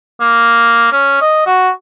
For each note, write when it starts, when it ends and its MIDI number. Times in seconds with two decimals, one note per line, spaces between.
0.21 0.89 58
0.92 1.19 61
1.21 1.42 75
1.46 1.69 66